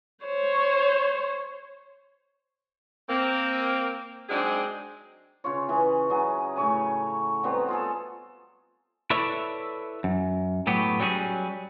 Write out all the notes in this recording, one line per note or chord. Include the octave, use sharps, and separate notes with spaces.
C5 C#5
A#3 C4
F#3 G#3 C4 D4 D#4 G#4
C#3 F4 C#5
E3 C#4 G#4
C#3 F#3 G#4
A2 C#3 C#5 G#5
F#3 G3 B3 C4
F4 G#4 A4
E4 A4 B4 C#5 D5 E5
F#2
A2 F#3 B3 G4
F#3 G3 C#4 F#4 G#4